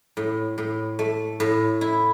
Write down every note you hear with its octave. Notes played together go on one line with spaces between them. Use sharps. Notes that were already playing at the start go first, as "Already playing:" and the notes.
A2
A2
A3
A2
E4